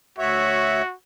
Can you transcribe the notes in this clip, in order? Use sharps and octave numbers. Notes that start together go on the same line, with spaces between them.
D2 F#4 C#5 E5